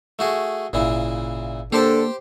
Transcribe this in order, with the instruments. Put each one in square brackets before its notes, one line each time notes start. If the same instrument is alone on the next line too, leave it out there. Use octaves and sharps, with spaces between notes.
[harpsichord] A3 F#4 G#4
[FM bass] G#1 [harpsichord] A#2 C#3 E4
[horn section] D3 A4 [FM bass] A#3 [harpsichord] G4 C5 G5